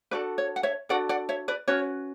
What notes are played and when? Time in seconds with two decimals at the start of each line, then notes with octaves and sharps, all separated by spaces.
0.11 D4 F#4 A4 B4 D5
0.38 C#5
0.56 F#5
0.63 C#5 E5
0.89 D4 F#4 A4 D5 F#5
1.09 D5 F#5
1.29 C#5 E5
1.48 B4 D5
1.68 C#4 F#4 B4 C#5